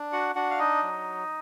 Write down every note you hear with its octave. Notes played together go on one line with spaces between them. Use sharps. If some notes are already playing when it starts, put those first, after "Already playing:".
Already playing: D4
F#4 F#5
D4 F#4 F#5
F5
D#4 D#5
F#3